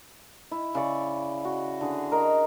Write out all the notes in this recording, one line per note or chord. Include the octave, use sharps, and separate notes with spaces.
E4
C#3 D5 C#6
F#4
D3 G#4
A#4 D#5